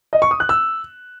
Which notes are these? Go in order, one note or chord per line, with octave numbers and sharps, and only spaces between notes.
D#5
C#6
D#6
F#6
E6